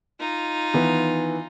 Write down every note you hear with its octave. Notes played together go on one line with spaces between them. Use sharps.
D#4 F4
D#3 E3 B3